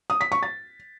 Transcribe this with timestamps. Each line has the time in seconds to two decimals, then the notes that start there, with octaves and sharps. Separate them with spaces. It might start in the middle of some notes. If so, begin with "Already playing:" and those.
0.10 D#6
0.21 B6
0.32 C#6
0.43 A6